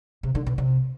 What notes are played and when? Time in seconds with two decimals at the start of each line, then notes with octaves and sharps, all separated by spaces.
0.23 C3
0.35 D3
0.46 B2
0.58 C3